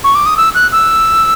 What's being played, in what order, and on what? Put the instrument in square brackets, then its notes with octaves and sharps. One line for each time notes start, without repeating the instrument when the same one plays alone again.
[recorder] C#6
D6
D#6
E6
F#6
E6